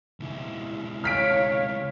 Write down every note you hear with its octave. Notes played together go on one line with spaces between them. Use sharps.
C#2 E4
C#5 F5 F6 B6 D7